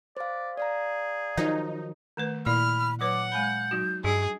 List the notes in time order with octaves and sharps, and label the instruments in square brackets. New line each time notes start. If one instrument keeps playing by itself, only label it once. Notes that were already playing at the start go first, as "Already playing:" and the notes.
[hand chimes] C5 F5 [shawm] D5
[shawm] G#4 [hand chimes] D5 F5 A#5
[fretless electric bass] D#3 F3 F#3 [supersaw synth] D#4
[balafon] D#3 A3 B4
[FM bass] A#2 [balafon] E4 D5 [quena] B5 [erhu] F6
[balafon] F#3 B4 C#5 [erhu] F#5 [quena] D6
[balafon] G#3 G#5 B5 [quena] G6
[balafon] F#3 D#4 F#4
[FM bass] G2 [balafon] G3 D4 [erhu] G#4